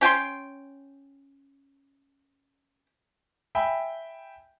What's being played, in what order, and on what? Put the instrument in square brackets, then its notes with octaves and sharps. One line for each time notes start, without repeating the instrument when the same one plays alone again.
[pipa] C#4 G5 G#5 C6
[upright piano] E5 G5 G#5 B5